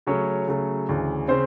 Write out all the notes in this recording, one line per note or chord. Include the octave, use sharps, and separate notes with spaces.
C#3 F#3 A3 C#4 C#5
C#3 F#3 A3
D2 C#3 E3
C#3 C4 C5